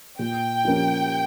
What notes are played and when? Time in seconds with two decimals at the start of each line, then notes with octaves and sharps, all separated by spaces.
0.19 A#2 G5
0.65 F3 A#3 C#4